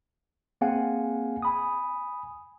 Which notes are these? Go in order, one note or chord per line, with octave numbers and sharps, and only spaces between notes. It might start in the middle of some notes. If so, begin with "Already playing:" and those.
A#3 C4 G#4 F5 F#5 G#5
G#5 B5 D#6